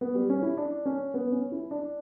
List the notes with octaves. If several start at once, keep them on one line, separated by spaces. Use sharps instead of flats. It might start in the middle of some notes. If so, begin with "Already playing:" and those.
B3
G3
C#4
E4
D4
C#4
B3
C#4
E4
D4